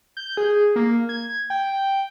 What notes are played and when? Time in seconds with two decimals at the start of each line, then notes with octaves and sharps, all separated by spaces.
0.17 G6
0.37 G#4
0.76 A#3
1.09 G#6
1.50 G5